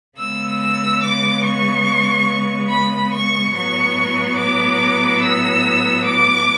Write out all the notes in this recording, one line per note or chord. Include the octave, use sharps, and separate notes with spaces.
C#3 G#3 B3 E6
E6
D6
C#6
B5
C#6
A2 F#3 B3 C#6
D6
E6
D6